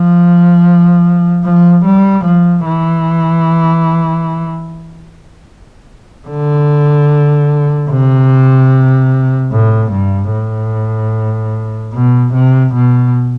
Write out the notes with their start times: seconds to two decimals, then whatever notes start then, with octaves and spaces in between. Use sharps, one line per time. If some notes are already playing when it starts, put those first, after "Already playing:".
Already playing: F3
1.44 F3
1.85 G3
2.24 F3
2.65 E3
6.28 D3
7.90 C3
9.51 A2
9.92 G2
10.32 A2
11.93 B2
12.33 C3
12.74 B2